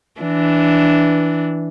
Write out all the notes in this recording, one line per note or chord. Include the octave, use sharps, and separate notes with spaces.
E3 D4